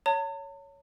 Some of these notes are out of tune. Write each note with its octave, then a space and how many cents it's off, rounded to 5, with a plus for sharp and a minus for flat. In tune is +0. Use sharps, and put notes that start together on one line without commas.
C#5 +10 A5 +45